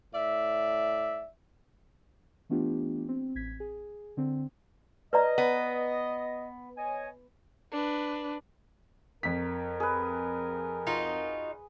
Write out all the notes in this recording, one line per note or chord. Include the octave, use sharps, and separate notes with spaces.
A2 D5 E5
E3 A3 B3 D4 F4 G4
C4
A1 G#6 B6
G#4
D3 C4
B4 D5 D#5 A#5
B3
C#5 D#5 G#5
D4 B4
F2 A#4 B6
G#4 B4
D#4 F4 F#4